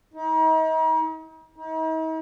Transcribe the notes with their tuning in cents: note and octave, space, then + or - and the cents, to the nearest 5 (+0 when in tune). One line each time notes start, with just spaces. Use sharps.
D#4 +40
D#4 +45